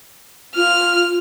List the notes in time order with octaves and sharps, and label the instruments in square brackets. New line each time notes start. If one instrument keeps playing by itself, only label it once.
[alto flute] F4 [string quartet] F6